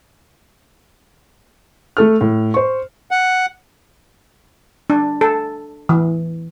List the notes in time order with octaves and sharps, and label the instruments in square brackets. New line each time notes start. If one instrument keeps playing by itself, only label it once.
[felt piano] A3 A4 F6
A2
C5 C#6
[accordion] F#5
[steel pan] D4
A4
E3